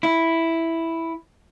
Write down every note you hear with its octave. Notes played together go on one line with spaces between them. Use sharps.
E4